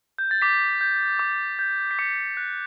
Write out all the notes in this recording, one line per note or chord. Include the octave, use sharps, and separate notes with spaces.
G6
A6
D6 B6
G6
D6
G6
B6
D6 C#7
F#6